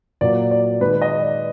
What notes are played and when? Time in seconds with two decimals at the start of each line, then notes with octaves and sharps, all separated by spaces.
0.21 A#2 F#3 A#3 D5
0.51 D5
0.81 G#3 B4
0.84 D#3
1.02 D#5
1.22 D5